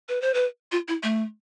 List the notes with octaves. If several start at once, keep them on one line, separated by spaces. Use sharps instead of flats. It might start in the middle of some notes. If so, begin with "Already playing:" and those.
B4
C5
B4
F4
E4
A3